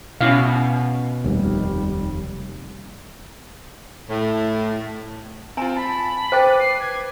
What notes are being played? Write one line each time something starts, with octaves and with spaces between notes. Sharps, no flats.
B2 C#4 E4 F5
F1 D#2 G3
A2
C4 F4 G#5 A#5
A5 B5
B4 C5 G5 D6 A6
C7
G#6